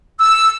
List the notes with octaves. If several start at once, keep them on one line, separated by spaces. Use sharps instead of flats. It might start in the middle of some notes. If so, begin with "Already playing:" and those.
E6